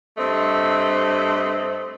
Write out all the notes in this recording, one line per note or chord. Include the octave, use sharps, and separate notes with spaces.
G2 A3 C4 D#5